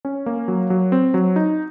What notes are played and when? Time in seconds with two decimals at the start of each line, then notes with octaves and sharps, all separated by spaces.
0.05 C#4
0.26 A#3
0.48 F#3
0.70 F#3
0.92 C4
1.14 F#3
1.36 D#4